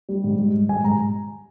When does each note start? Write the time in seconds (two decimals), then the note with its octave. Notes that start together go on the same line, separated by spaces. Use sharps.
0.09 G3
0.24 G#2
0.39 G3
0.54 G3
0.69 G#2 G#5
0.84 G#2 A#5